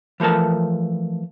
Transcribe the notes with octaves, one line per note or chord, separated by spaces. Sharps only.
E3 F3 A3 A#4 A5